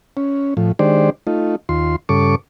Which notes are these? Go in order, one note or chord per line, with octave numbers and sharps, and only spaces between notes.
C#4
A2 F3
D#3 G#3 D4 G4 C5 D5
A3 D#4 F4
D#2 F4 C6
G2 C#3 A4 C#6 D6